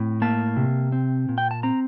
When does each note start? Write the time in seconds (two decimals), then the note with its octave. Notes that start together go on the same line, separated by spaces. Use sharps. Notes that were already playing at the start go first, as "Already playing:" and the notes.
Already playing: A2 C4
0.22 A#3 A5
0.57 C3
0.92 C4
1.29 A#2
1.38 G5
1.51 A5
1.63 C4 A#5